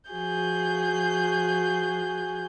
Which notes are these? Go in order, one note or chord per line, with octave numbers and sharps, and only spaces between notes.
F3 F#4 G#4 G6